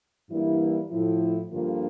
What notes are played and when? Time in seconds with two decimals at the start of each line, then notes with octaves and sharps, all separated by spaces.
0.29 G2 E3 G3 A#3 E4
0.91 A2 F3 A3 E4
1.51 G2 D3 F3 A#3 F4